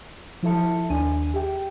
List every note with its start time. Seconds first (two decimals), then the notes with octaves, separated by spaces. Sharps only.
0.43 F3 E4 A4 E5 A5 C#7
0.90 D#2 D4 E5 G#5 D#7
1.34 G4 G#4 E5 G5